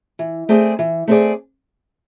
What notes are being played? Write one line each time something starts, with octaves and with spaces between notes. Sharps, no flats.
E3
A3 C4 G#4 D5
E3
A3 C4 G#4 D5